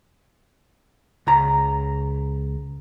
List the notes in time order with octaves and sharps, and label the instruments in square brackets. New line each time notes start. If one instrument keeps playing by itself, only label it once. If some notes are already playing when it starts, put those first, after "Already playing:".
[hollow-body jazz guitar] C#2 A#5